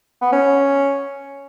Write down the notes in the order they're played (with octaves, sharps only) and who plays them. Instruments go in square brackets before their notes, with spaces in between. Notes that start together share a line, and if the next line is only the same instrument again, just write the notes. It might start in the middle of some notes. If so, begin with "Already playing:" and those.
[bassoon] B3
C#4